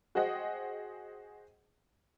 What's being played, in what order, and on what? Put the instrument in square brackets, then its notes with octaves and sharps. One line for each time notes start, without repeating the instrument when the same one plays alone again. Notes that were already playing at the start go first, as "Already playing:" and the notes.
[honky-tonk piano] F#4 G#4 C5 D#5 F#5 G5